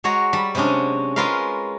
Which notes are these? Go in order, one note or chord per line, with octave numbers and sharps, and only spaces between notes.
G#3 F#4 C#5 F#5 A#5
G3 A5 B5
C3 F#3 G#3 C#4 D4
G#3 C#4 F4 A#4 B4 F5